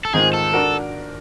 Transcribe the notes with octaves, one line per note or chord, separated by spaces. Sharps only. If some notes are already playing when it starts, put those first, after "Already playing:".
A4
G#2 D#3 G#3 C4 F4 G#4
A4
D4 F#4 A#4